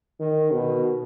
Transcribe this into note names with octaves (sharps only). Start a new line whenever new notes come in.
D#3
B2